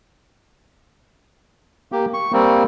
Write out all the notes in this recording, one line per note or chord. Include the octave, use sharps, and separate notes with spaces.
A#3 G4
C#6
G3 A#3 C4